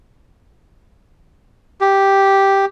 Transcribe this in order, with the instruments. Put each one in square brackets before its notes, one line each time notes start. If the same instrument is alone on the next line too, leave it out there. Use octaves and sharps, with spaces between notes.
[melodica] G4